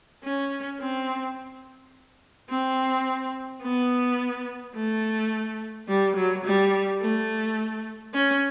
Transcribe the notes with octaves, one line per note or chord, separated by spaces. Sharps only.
C#4
C4
C4
B3
A3
G3
F#3
G3
A3
C#4